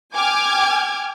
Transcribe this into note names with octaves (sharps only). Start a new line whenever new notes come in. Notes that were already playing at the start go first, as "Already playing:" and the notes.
G5 G#5 D6 F6 G#6